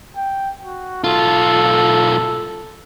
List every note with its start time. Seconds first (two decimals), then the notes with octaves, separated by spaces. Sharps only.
0.17 G5
0.63 F#4
1.04 B1 F4 A4